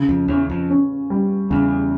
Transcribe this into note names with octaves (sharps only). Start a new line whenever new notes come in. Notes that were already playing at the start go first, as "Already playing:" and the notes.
Already playing: C#3
F2
E2 C#4
F2
C#4
G3
E2 C#3